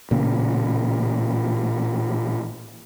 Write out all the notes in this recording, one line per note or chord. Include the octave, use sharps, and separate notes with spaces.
A1 A#2 C#3